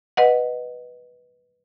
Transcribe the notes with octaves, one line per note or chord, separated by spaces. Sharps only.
B4 D#5 F#5